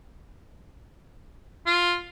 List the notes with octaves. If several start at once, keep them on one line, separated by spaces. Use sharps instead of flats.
F4